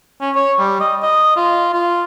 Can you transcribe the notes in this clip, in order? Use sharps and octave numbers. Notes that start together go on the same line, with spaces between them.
C#4
C#5
G3
D#5
D#5
F4
F4